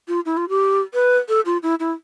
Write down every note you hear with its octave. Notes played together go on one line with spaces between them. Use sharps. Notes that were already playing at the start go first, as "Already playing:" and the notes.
F4
E4
F4
G4
B4
A4
F4
E4
E4